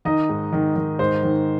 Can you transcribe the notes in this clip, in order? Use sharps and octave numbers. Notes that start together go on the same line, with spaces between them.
D#3 D#4 D#5
G#2
D#3
D#3
G#2 C5
D#3